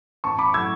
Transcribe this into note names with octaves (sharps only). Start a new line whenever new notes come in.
A1 A5 C#6
B5 D6
A2 F#3 E6 G#6